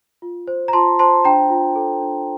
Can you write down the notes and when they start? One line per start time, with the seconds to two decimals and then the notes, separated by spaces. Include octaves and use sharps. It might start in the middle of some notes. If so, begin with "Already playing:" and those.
0.22 F4
0.48 C5
0.68 A#5
0.73 F4 A5 C6
0.99 C5 A5 C6
1.25 D4 G5 A#5
1.50 F4
1.75 A4
2.01 D4